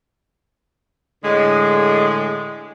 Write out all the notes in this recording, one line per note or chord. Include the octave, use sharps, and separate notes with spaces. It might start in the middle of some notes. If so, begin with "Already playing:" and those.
A2 D3 G#3